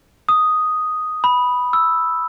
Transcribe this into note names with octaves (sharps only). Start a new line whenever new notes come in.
D#6
B5
E6